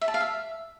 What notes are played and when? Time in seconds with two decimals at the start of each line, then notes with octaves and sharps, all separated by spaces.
0.01 E5
0.08 A5
0.14 F5
0.20 E5